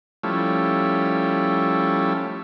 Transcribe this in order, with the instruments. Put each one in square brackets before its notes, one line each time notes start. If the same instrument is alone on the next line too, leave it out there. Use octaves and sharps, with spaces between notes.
[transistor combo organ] F3 G3 A3 C#4 E4